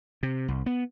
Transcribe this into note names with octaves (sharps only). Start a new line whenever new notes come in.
C3
C2
B3